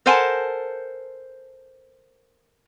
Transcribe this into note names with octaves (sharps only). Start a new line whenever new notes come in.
A4 A#4 C5 F#5 G#5 A5